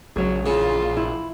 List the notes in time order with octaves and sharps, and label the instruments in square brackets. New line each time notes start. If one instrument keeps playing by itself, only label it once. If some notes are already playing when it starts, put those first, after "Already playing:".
[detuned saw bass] A#1 [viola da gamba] C#3 F#3 [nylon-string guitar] G#4 C#5
[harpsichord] C#3 [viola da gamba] E3 F4
[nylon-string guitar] E4